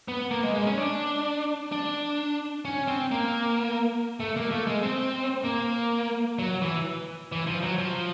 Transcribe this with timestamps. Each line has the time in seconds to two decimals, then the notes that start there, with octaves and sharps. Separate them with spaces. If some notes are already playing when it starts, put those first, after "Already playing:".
0.08 B3
0.31 A#3
0.43 G#3
0.54 G#3
0.67 C#4
0.78 D4
1.72 D4
2.65 C#4
2.88 C4
3.12 A#3
4.20 A3
4.36 A#3
4.51 A3
4.67 G#3
4.83 C4
5.44 A#3
6.39 F#3
6.62 E3
7.32 E3
7.47 F3
7.62 F#3
7.78 F3